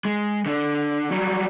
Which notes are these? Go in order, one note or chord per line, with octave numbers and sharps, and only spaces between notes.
G#3
D3 D4
F#3 G3